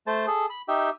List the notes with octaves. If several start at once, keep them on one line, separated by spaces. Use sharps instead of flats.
A3 C5 A5
G#4 A4
B5
D#4 G4 E5 G5